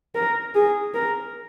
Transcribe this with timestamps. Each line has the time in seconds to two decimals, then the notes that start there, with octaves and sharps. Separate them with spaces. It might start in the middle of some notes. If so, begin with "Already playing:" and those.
0.15 A#4
0.55 G#4
0.94 A#4